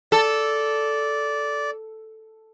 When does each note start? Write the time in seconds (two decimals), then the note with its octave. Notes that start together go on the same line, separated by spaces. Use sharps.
0.12 A4 D5